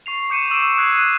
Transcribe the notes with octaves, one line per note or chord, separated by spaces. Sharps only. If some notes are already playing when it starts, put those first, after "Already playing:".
C#6 C7 F7
D6 G6 C#7 D#7 E7
C#6 E6 G6 C7 D7 E7
D#6 F#6 G#6 C7 D#7